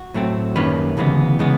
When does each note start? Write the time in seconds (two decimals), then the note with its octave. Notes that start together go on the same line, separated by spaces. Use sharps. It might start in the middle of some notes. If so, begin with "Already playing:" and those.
Already playing: F#4
0.14 A2 F#3 A3 C4
0.55 F#2 D#3 G3 A#3 C#4 B4
0.97 D2 C#3 E3 G#3 B3
1.39 C#3 E3 G#3 B3